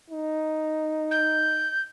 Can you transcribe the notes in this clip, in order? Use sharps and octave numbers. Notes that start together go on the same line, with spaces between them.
D#4
G6